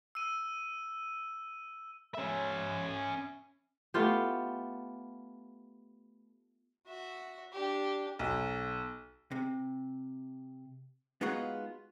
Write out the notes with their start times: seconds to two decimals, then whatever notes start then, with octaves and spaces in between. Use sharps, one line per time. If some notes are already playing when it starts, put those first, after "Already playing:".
0.15 E6 D#7
2.15 C#4 E5
3.94 A3 B3 F4 G4
6.87 F#4 E5
7.53 D4 G4
8.19 B1
9.31 C3
11.21 G#3 B3 D#4 F4 F#4 G#4